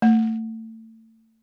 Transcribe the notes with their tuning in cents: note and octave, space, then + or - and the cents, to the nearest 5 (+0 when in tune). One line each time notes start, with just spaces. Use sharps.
A3 +30